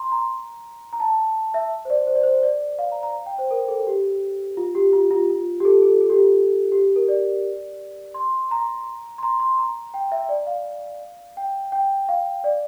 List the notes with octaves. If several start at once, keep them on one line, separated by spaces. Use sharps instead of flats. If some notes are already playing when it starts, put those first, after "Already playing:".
Already playing: A#5 C6
A#5
A#5
A5
E5
C5
D5
C5
D5
C5
D5
F5
A#5
A#5
G5
C5
A#4
A4
G4
F4
G4
F4
F4
F4
G4
A4
A4
A4
G4
F4
F4
G4
A#4
D5
C6
A#5
C6
A#5
C6
A#5
G5
E5
D5
F5
G5
G5
F5
D5